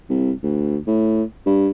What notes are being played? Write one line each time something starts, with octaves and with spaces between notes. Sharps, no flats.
C2
D2
A2
G2